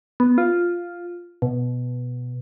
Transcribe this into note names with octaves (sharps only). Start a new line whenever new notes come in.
B3
F4
B2